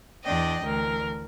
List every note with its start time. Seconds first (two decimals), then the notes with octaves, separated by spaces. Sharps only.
0.25 E2 D4 D5 D#5 G5
0.63 D2 E3 A#4